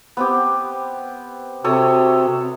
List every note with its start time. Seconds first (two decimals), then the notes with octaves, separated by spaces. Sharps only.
0.17 B3 C4 G4
1.64 C3 F#4 A4 C#5 D#6